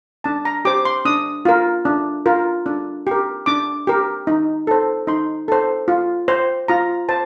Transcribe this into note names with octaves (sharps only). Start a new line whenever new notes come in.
D4 A5
A#5
G4 C5 D6
C6
D4 D#6
F4 A#4
D4
F4 A#4
D4
G4 A#4
D4 D6
G4 A#4
D#4
A4 C5
D#4 C6
A4 C5
F4
C5
F4 A#5
C5 A5